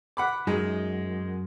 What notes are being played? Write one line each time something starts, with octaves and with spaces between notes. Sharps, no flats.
F#5 B5 D6
F#2 G#3 D#4